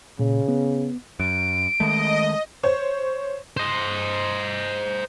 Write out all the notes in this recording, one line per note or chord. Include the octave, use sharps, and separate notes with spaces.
A#2 C#3
B3
F#2 D7
D#3 G#3 A3 D#5
C5 C#5
C5 D#5